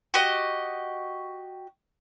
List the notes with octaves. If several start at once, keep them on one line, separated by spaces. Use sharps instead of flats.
F#4 G4 D#5